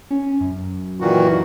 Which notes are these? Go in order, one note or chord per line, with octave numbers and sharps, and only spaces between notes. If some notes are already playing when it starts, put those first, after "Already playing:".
C#4
F#2
A#2 D#3 E3 F#4